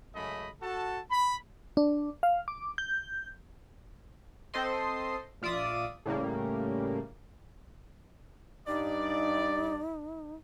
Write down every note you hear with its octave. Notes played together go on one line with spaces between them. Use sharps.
F#2 C#3 G#3 A3 D#5 B5
F#4 A4 A5
B5
D4
F5
D6
G6
C4 A4 C5 D#5 C6
A#1 F4 D5 E5 D#6
A2 C#3 G3 A#3
G2 D#4 D5